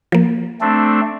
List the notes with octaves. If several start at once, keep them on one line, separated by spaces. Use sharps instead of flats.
F3 A#3
A3 C4 D4